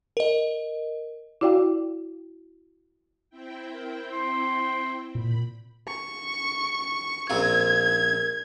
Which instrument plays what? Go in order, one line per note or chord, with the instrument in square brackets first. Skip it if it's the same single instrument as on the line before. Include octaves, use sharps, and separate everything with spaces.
[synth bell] A#4 D#5
[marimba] E4 F#4 D5 F5 G5
[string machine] C4 E4 G5
[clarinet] A#4
C6
[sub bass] A#2 [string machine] B5
[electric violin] C#6
[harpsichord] A#1 C4 F4 [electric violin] G#6